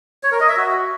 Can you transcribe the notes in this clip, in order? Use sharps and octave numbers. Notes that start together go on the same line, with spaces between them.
C#5
A#4
D#5
E5
F#4